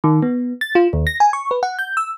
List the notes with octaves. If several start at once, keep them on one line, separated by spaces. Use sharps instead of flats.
D#3
B3
A6
F4
D#2
A#6
G#5
C#6
B4
F#5
G6
E6